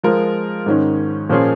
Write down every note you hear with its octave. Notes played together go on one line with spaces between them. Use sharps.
F3 G#3 F4 A#4
G#2 D#3 C#4
A#2 F3 A#3 C#4 G#4